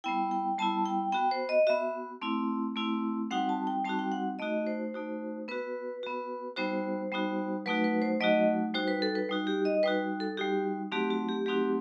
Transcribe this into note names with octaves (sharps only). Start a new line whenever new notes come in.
G3 B3 E4 G5
G5
G3 B3 E4 A5
G5
B3 F#4 G5
C5
D#5
B3 F#4 E5
A3 C4 E4
A3 C4 E4
G3 C4 D#4 F#4 F#5
A5
G5
G3 C4 D#4 F#4 A5
G5
F#5
A3 D#4 F#4 D#5
C5
A3 D#4 F#4
B3 F#4 B4
B3 F#4
G3 B3 D#4 F#4 C5
G3 B3 D#4 F#4
F#3 A3 D#4 F#4 B4
B4
C5
F#3 A3 D#4 F#4 D#5
G3 D#4 F#4 C5
B4
A4
B4
G3 D#4 F#4
G4
D#5
G3 D#4 F#4 B4
A4
G3 D#4 F#4 G4
F#3 A3 C4 D#4 F#4 G4
F#4
G4
F#3 A3 C4 D#4 F#4 G4